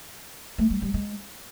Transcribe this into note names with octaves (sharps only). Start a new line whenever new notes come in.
A3
G3
G3
G#3